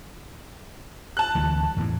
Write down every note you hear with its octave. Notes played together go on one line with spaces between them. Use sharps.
A5 F#6
D2 E3 G3
E2 A2 E3